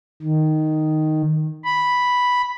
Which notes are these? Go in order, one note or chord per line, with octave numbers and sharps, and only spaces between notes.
D#3
B5